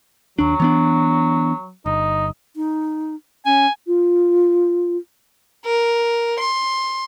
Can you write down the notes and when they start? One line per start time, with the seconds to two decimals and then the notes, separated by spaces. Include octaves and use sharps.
0.39 D#2 F#3 D4
0.60 E3 B3 D4
1.86 G1 D#4
2.56 D#4
3.46 C#4 G#5
3.87 F4
5.65 A#4
6.40 C6